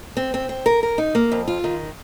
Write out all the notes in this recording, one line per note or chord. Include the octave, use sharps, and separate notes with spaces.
C4
C4
C4
A#4
A#4
D#4
A#3
F2
F4
D#3